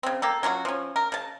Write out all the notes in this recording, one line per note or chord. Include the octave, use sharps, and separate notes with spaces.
C#3 C4
A#3 G4 A4
F#3 C#4 F4 F#4
F3 C#4
A#4
C#3 A5